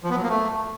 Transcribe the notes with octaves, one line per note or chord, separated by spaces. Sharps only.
F3
B3
F#3
A#3
A3